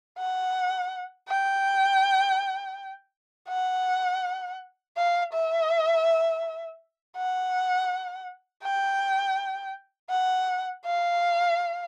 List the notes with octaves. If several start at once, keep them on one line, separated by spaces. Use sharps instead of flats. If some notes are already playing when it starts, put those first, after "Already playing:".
F#5
G5
F#5
F5
E5
F#5
G5
F#5
F5